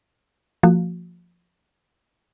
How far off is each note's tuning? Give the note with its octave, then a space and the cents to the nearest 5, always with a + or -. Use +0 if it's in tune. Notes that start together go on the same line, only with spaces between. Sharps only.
F3 +0 A#3 -45 F#4 +0